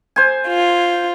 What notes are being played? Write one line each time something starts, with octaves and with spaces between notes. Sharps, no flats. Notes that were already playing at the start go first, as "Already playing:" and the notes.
C5 G#5
F4